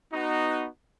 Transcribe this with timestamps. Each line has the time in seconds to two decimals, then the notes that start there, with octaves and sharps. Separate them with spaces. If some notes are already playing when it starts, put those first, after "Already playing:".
0.12 B3 D#4 F#4